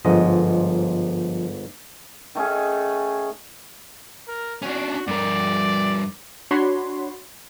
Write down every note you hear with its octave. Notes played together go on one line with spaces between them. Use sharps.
G1 G#2 F3 D#5
D#3 A3 C#4 G#4
A#4
C#4 D4 F#4
G2 A#4 D5
D4 F#4 C#5 B5 C6